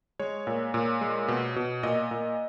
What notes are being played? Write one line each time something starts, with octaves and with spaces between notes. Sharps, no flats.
G#3 C#5
A#2
A#2
G#3
B2
B2
A#2 D#5
A#2